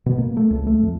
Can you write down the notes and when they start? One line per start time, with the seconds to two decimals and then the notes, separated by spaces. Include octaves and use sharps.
0.06 B2
0.18 A#3
0.37 A3
0.51 C#2
0.67 A3
0.83 F2